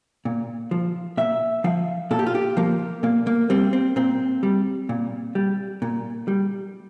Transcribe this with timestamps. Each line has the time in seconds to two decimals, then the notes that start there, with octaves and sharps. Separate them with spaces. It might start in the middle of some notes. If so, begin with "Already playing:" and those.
0.25 A#2
0.71 F3
1.17 A#2 E5
1.64 F3 F5
2.11 A#2 A4
2.19 G4
2.26 F4
2.35 G4
2.57 F3 A#3
3.03 A#2 A#3
3.27 A#3
3.50 G3 C4
3.73 C4
3.96 A#2 C4
4.43 G3
4.89 A#2
5.35 G3
5.82 A#2
6.28 G3